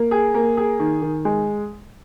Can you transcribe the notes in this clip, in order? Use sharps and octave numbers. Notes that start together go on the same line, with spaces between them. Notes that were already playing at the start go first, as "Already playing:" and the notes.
Already playing: A#3
G#4
A#3
G#4
D#3
D#3
G#3